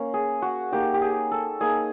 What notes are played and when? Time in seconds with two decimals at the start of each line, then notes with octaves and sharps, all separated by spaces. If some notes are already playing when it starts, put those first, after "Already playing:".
Already playing: A#3 C#4
0.14 G#4
0.42 F#4
0.72 A#3 D#4 G4
0.94 G4
1.02 G#4
1.31 A4
1.61 A#3 D#4 G#4